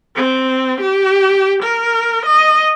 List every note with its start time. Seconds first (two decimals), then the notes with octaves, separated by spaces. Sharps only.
0.16 C4
0.81 G4
1.63 A#4
2.26 D#5